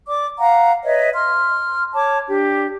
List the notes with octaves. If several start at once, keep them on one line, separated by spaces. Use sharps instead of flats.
D5 D6
F5 F#5 A#5
B4 C#5 D#5 E5
C6 F6
C#5 A5 D6
D4 G4